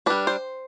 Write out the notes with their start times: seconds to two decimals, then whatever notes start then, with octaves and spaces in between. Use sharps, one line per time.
0.06 G3 D4 B4
0.27 C5